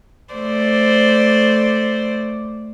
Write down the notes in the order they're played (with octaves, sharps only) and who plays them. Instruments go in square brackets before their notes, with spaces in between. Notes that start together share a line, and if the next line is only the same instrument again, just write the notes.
[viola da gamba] A3 C5 D5